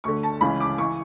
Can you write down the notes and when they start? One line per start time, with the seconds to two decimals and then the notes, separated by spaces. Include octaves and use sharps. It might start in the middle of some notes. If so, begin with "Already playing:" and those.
0.04 D2 D3 C#6
0.23 A5
0.41 C#2 C#3 E3 B5
0.60 D6
0.78 E3 C#6